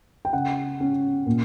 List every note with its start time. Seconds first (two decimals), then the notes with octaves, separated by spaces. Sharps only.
0.25 G5
0.33 C#3 F#5
0.80 C#4
1.26 A#2